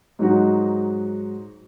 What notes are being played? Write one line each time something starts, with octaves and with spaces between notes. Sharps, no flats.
G#2 F#3 D#4 F#4